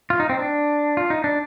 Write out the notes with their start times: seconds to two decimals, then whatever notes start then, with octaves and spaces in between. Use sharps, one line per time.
0.10 F4
0.20 D#4
0.29 C4
0.39 D4
0.97 F4
1.10 D#4
1.24 D4